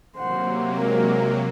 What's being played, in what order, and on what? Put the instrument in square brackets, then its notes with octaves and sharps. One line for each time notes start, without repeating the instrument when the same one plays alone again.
[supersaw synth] C3 F#3 A#3 [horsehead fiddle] C5 F#5
[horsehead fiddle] G#3 A#4